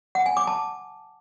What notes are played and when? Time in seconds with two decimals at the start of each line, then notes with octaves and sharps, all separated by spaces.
0.15 F#5
0.26 G#5
0.37 D6
0.47 A5